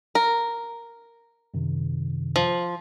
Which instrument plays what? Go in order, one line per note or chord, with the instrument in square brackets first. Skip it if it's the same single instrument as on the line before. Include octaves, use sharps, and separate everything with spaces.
[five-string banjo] A#4
[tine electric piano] F#2 C3 D#3
[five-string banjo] F3